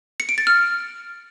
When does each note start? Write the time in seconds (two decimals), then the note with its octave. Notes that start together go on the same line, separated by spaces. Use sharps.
0.20 C#7
0.29 D7
0.38 A6
0.47 F6